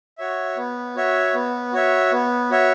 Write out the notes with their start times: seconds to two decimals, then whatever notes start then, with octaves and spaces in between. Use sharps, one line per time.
0.18 F#4 C#5 E5
0.57 B3
0.96 F#4 C#5 E5
1.34 B3
1.73 F#4 C#5 E5
2.12 B3
2.51 F#4 C#5 E5